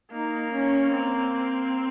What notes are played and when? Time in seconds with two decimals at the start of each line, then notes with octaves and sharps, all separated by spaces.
0.12 A#3 D#4
0.52 C#4
0.92 C4